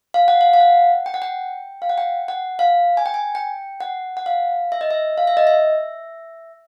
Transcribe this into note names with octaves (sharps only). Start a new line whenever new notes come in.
F5
F#5
F5
F5
F#5
G5
F#5
G5
F5
F#5
G5
F#5
F5
G#5
G5
G#5
G5
F#5
F#5
F5
E5
D#5
E5
F5
E5
D#5
E5